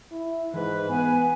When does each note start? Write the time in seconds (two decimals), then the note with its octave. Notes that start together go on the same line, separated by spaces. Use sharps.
0.12 E4
0.54 G#2 E3 B4
0.89 B3 G#5